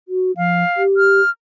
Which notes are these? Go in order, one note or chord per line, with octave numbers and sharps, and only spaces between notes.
F#4
F3 F5
G4
F6